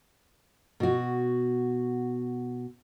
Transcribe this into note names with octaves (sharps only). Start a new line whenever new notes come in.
B2 F#4